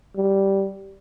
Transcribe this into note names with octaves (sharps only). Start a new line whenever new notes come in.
G3